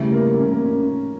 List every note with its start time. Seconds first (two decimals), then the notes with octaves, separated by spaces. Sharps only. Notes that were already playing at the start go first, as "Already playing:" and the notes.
Already playing: C#3 E3 G3 A3
0.12 A#3
0.39 C#4
0.52 A#3
0.64 C#4